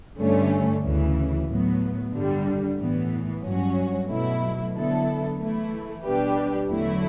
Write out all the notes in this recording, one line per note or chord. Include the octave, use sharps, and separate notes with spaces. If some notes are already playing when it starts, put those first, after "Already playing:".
G2 D3 A3 C#4
D2 C#3 E3
A2 F#3 B3
G2 D3 G3
A2 E3 B3
G2 F#3 C#4 F#4
B2 F#3 A3 E4
D3 F#3 B3 E4 A4
E3 A3 E4
B2 G3 D4 G4 B4
E2 D3 F#3 A3 E4